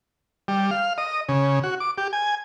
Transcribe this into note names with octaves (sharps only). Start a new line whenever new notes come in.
G3
F5
D#5
C#3
F#4
D6
G4
G#5